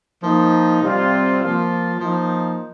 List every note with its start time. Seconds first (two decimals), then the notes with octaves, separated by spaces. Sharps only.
0.23 F3 A#3 D#4
0.82 C3 G3 C4 F4
1.41 F3 A#3 F4
1.99 F3 A#3 D#4